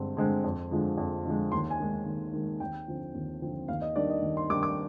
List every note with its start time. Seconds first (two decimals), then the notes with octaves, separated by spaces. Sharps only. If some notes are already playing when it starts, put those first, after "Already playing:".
Already playing: G2 D3 G#3 C4
0.17 D3 G#3 C4
0.44 F2
0.71 D3 F3 G#3
0.98 F2
1.25 D3 F3 G#3
1.52 D#2 C6
1.70 G#5
1.80 D#3 G#3
2.06 D#2
2.33 D#3 G#3
2.60 D#2 G5
2.88 D3 F3 C4
3.14 D#2
3.41 D3 F3 C4
3.68 D#2 F5
3.82 D#5
3.96 D#3 G3 D4 D5
4.10 D#5
4.22 D#2
4.37 C6
4.50 D#3 G3 D4 D6
4.63 D6